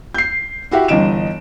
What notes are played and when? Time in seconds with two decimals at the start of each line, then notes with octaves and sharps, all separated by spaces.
0.14 G6 C7
0.71 E4 F#4 G4 E5
0.88 G1 D3 E3 D#5 D7 E7